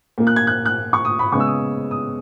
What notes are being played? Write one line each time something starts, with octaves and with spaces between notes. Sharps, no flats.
A#2 A#3
F#6
G#6
F#6
F#6
C#6
D#6
B5
C#3 G#3 B3 C#6
E6
D#6
D#6